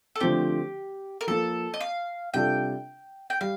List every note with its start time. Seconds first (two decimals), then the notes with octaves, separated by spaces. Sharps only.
0.15 A4
0.20 D3 F3 A3 C4 G4
1.21 A#4
1.27 F3 A#3 F4 A4
1.74 D#5
1.81 F5
2.34 C3 G3 D4 F4 A4 G5
3.30 G5
3.41 G3 F5